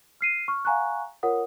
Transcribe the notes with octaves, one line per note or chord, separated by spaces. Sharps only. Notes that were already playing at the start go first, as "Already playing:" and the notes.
F6 C7 D#7
C#6 F6
F5 F#5 G#5 A#5 C#6 F#6
F4 A#4 C#5 F#5 D#6